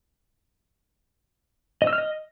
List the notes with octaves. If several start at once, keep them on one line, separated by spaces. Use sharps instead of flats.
D#5
E6
F6
D#5